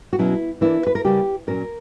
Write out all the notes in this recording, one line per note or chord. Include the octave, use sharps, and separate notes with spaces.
F#4
B2 F#3 C#4 E4
E3 A#3 D4 E4
B4
A#4
C#3 G3 A#3 C#4 G4
A#2 F#3 C#4 A#4